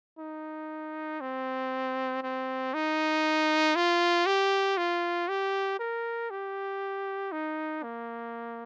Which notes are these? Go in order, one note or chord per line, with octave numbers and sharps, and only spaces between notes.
D#4
C4
C4
D#4
F4
G4
F4
G4
A#4
G4
D#4
A#3